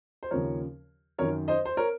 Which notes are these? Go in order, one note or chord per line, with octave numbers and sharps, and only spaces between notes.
C5
D#2 C#3 F3 A#4 C#5
F#2 D#3 A#4 C#5
C5 D#5
C5
A#4 C#5